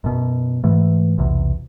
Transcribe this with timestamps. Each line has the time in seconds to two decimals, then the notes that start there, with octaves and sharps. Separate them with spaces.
0.04 F#2 B2
0.64 G#2 E3 A3
1.18 B1 E2 C3